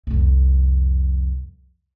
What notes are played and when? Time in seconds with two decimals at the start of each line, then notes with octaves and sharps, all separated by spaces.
0.07 C2 F2